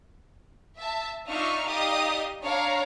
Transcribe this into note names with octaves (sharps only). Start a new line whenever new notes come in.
E5 A5
D4 D#4 F4 E5 C#6 F6
D#4 G4 D5 D#5 F5 D#6
D4 C#5 F5 A#5